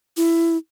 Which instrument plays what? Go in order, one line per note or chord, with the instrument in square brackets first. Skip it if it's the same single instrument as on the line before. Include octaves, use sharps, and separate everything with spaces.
[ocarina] E4